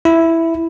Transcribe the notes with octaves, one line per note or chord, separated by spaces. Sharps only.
E4